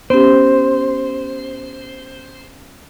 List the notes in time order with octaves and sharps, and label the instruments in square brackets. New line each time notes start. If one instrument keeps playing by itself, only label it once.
[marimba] B3 C#4 G4 [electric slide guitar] C5